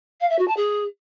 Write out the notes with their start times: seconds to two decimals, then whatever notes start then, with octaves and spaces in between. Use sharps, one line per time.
0.20 F5
0.29 E5
0.38 F#4
0.47 A5
0.56 G#4